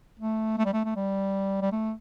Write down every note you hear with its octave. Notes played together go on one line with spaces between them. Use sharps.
A3
A3
G3
A3
A3
G3
G3
A3